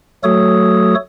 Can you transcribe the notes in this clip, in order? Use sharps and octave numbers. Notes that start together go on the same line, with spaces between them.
F#3 A3 F#4 A4 C#5 D#6